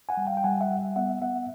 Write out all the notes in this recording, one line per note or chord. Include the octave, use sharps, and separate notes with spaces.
F#5 G#5
G3
F5 G5
G5
G3 F#5 G#5
E5 F#5
G3
B3 E5 F#5
B3 E5 F#5